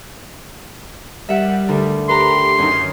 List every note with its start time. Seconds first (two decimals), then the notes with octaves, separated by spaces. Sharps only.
1.29 G3 E5 F#5
1.69 D2
2.09 G4 B4 A#5 C6
2.59 F#2 D#3 C#4 D#4